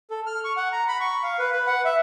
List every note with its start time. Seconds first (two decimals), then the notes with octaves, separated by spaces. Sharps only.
0.10 A4
0.26 F6
0.44 C#6
0.57 F#5
0.72 A#5
0.88 B5
1.00 C#6
1.23 F5
1.39 B4
1.52 B4
1.67 F#5
1.85 E5